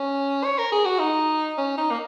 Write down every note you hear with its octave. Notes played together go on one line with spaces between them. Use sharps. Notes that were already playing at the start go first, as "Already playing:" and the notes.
Already playing: C#4
C#5
A#4
G#4
F#4
D#4
C#4
D#4
A#3